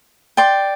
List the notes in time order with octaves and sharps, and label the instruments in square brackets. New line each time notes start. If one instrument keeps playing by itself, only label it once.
[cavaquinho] D5 G5 C6